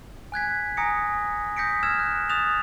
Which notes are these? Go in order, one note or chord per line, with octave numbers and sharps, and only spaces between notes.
G#5 F#6 G#6 B6
G#5 A#5 D#6 A#6 C#7
D#6 G6 A#6 B6 C#7 D7
E6 F6 G#6 E7
F#6
D#6 F#6 A6 E7 F7